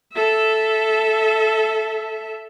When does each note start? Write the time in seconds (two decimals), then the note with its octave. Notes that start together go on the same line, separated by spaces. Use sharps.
0.14 A4 E5